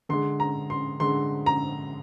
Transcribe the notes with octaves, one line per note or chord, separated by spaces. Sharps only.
D3 G#3 C6
A#5
C6
D3 G#3 C6
A#5